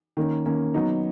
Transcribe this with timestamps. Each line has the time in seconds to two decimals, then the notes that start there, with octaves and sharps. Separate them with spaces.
0.17 D#3 A#3 C#4
0.46 D#3 A#3 C#4
0.74 F#3 B3 D#4